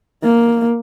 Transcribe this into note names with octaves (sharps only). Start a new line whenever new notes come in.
A#3